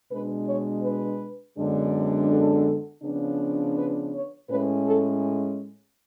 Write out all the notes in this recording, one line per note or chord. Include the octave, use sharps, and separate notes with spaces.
B2 G#3 D4 B4
C#5
B4
F#2 D3 G#3 B3 D4
A4
C#3 F3 B3 D4
B4
C#5
A2 G#3 C#4 B4
A4